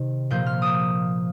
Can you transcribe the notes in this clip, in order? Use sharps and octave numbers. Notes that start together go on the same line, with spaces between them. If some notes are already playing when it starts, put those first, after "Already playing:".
Already playing: C3 D#3 C4
A#2 F3 A#3 G6
F6
D#6